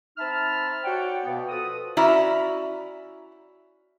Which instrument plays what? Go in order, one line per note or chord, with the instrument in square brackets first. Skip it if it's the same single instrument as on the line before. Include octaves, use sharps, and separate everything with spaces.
[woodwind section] C4 D#4 E5 A5 B5 F6
F#4 C#5 D5 F#5 G5
B2 A#3 B3
F3 F#4 A4 B4 D#6
[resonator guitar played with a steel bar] C#4 E4 F#4 D5 E5 A#5